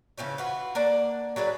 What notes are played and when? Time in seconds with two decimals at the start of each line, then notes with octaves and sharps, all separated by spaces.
0.18 C#3 E3 F3 C#4
0.38 F4 F#4 B4
0.75 A#3 D4 D5 F#5
1.36 F#3 D4 G#4 B4